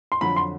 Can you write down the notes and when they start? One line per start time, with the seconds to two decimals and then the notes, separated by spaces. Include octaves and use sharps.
0.12 C6
0.21 F2 D3 F#3 B5
0.37 C6